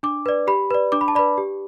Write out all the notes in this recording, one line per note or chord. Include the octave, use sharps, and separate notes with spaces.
D4 D6
B4 D5
G4 B5
B4 D5
D4 D6
B5
A5
B4 D5 B5
G4